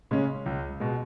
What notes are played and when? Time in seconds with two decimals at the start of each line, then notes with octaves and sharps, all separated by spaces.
0.11 C#3 G#3 C#4
0.46 C#2
0.80 B2 G#3